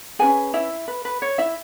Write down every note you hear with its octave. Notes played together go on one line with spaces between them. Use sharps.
C#4 F#4 G#4 B4 G#5
E4 E5
B4
B4
C#5
E4 E5